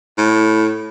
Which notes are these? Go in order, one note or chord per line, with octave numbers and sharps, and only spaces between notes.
A2